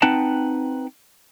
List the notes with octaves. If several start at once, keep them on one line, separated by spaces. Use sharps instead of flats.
C4 D#4 B4 F#5 G5 A5